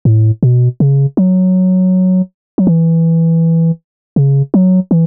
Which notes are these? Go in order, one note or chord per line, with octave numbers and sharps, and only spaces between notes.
A2
B2
C#3
F#3
F#3
E3
C#3
F#3
E3